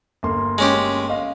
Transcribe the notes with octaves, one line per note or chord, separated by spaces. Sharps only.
G1 A#3 C6
G#3 C#4 G4
D#5 F5